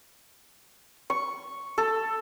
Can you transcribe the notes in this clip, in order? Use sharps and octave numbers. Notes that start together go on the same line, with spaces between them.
C#6
A4